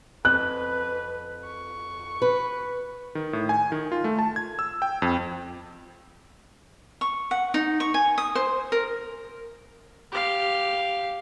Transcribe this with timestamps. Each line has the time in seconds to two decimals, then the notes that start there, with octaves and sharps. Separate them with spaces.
0.25 F2 B4 F#6
1.44 C#6
2.22 B4
3.15 D#3
3.33 A2
3.49 G#5
3.72 D#3
3.92 F4
4.04 A3
4.19 A5
4.36 G#6
4.59 E6
4.82 G5
5.02 F2
7.01 C#6
7.31 F#5
7.54 D#4
7.80 C#6
7.94 G#5
8.18 D#6
8.35 C5
8.72 A#4
10.11 G4 F5